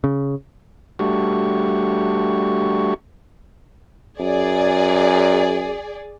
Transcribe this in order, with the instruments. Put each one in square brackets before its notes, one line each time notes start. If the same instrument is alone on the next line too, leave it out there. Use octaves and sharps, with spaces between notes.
[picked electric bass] C#3
[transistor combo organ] G3 A3 D4 F#4 G4 C#6
[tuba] F#2 [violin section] G#4 D5